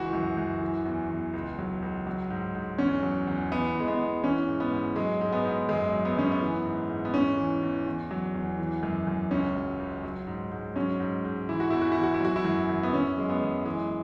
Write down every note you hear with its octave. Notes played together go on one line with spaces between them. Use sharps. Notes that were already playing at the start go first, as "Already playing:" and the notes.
Already playing: C#2 E3 F#4
F#2
F#2
E3
E2
E2
C#2
F#3
C#2
F#3
G#2
G#2
E2 C#4
F#3
E2
E3 B3
E2 G#3
B3
E2
E3 C#4
G#2
B3
G#2
F#3 G#3
G#2 G#3
B3
G#2
F#2 G#3
F#3
B3
F#2 C#4
B3
E3
G#2
G#2
B3
E2 C#4
E3
E2
E2
F#3
E2
E3
F#2
F#2
C#2 C#4
F#3
C#2
F#3
G#2
G#2
F#3 C#4
G#2
G#2
E3 E4
F#4
E2 E4
F#4
E2 E4
F#4
E4
F#3 F#4
E4
F#2
F#2
B3
F#2 C#4
F#3 G#3
B3
F#2
E3 G#3